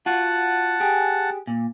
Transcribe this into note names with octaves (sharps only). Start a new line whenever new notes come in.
F4 F#4 F#5 A5
G4 G#4
A#2